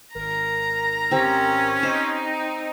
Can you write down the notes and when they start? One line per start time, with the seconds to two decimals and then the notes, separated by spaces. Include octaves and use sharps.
0.15 G#1 A#4 A#5
1.11 C4 C#4 G4
1.83 C4 D#4 C5 D#5 G5